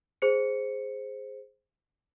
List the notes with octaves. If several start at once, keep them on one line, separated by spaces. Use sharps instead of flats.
G#4 C5 C#7